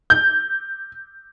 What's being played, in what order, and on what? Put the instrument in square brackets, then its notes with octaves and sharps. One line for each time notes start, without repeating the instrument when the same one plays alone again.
[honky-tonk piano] G6